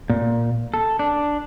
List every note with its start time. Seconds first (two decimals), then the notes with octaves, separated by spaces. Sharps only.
0.10 A#2
0.74 A4
0.99 D4